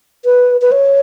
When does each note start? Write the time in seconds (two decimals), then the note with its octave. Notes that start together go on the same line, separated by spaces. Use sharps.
0.25 B4
0.62 B4
0.72 C#5